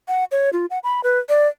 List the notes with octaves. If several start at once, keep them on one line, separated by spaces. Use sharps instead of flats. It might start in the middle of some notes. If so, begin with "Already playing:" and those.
F#5
C#5
F4
F#5
B5
B4
D5